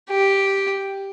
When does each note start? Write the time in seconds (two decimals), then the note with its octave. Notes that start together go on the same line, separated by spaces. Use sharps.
0.10 G4